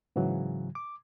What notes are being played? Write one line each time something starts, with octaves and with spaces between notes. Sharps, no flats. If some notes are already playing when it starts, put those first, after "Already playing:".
G#2 C#3 E3 F#3
D6